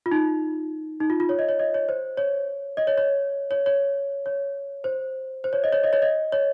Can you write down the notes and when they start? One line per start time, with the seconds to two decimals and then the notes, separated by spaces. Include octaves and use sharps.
0.06 F4
0.11 D#4
1.00 D#4
1.10 F4
1.20 F4
1.29 C#5
1.39 D#5
1.49 C#5
1.59 D#5
1.74 C#5
1.89 C5
2.18 C#5
2.77 D#5
2.87 C#5
2.98 C#5
3.51 C#5
3.66 C#5
4.26 C#5
4.84 C5
5.44 C5
5.53 C#5
5.64 D#5
5.73 C#5
5.84 D#5
5.93 C#5
6.02 D#5
6.32 C#5